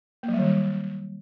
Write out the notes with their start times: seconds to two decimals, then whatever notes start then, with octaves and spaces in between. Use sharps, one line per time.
0.23 A#3
0.28 F#3
0.34 G3
0.39 D#3
0.44 G3